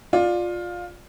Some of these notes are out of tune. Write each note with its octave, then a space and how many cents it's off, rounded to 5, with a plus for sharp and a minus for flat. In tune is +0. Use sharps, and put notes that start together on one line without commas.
F4 +15 D5 +15